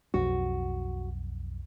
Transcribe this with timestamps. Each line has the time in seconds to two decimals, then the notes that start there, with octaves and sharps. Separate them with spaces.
0.14 B1 F2 F#4